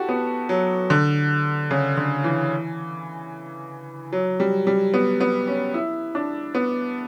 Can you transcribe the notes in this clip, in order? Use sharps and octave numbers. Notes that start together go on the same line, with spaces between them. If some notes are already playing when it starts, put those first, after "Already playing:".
Already playing: E4 F#4 G4 A4
B3
F#3
D3
C#3
D3
E3
F#3
G3
G3
B3
B3
C#4
E4
D4
B3